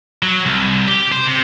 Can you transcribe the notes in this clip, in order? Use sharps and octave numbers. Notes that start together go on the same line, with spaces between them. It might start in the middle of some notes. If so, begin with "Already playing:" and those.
F#3
C2
G4
C5
C3